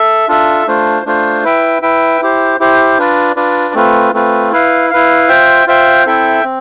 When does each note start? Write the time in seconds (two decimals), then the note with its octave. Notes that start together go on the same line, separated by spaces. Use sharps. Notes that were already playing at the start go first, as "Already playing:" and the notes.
Already playing: A4 E5
0.28 D4 F4 A4 E5
0.67 A3 D4 F4 C5
1.06 A3 D4 F4 C5
1.44 E4 B4 E5 G5
1.82 E4 B4 E5 G5
2.21 E4 G4 C5
2.60 E4 G4 C5
2.99 D4 F4 B4 D5
3.36 D4 F4 B4 D5
3.74 A3 C4 F4 B4
4.14 A3 C4 F4 B4
4.52 E4 B4 F5
4.91 E4 B4 F5
5.28 F4 C5 E5 G5
5.67 F4 C5 E5 G5
6.06 C4 E4 A4 E5 G5
6.44 C4